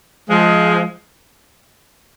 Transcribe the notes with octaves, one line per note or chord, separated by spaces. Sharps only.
F3 G#3